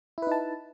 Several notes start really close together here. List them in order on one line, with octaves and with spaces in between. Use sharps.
E4 B4 D#4 A5